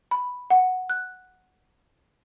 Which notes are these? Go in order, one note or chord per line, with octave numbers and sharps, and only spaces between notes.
B5
F#5
F#6